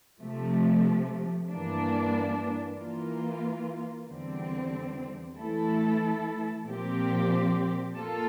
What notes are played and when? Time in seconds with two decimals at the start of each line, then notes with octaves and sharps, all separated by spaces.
0.21 C3 F3 A3
1.50 G2 E3 A#3 D4
2.78 E3 A#3 F4
4.09 E2 D3 G3 C4
5.37 E3 A3 E4 A4
6.67 A#2 F3 C4 G4
7.96 A#3 F4 A4